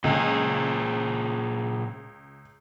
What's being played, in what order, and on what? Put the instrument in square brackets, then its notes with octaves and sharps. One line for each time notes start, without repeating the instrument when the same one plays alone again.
[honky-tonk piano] C#2 [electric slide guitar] A#2 G#4